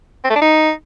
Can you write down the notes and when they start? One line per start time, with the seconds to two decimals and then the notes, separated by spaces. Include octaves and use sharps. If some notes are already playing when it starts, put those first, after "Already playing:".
0.24 C4
0.30 A3
0.36 D4
0.41 D#4